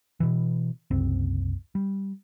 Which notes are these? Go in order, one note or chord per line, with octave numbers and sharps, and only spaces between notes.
B2 E3
F#1 C2 C4
G3